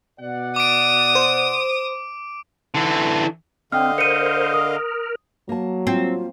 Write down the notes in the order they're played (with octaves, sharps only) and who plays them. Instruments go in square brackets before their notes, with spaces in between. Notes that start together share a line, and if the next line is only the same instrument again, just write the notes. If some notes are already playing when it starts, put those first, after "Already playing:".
[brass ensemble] B2 D5 F#5
[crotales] D6 D7 [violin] D#6
[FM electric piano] C5
[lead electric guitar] D3 E3
[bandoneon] D3 D#5 F5 [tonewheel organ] C4 [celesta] G5 F6
[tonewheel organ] A#4 C5 [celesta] C#7 D#7
[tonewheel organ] A#4 [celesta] D#6
[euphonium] F#3 [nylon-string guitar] A#3 A5
[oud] C4 [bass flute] F4